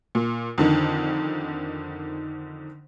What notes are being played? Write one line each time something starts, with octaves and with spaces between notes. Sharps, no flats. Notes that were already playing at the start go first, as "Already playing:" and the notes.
A#2
F2 D3 D#3